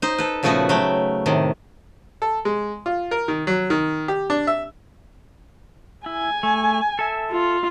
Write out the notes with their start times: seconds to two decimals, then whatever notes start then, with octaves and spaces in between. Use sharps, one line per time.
0.02 D#4 C5
0.18 A4 B4
0.43 A#2 C#3 F3 A3 B3 F#4
0.69 F#3 A3 G5
1.26 A2 C3 D#3
2.22 A4
2.45 G#3
2.86 F4
3.11 A#4
3.28 D#3
3.47 F#3
3.70 D#3
4.08 G4
4.30 D4
4.47 E5
6.06 E4 G#5
6.43 A3
6.99 A4 E5
7.32 F4